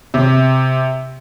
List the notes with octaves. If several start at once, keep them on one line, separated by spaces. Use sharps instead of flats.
C3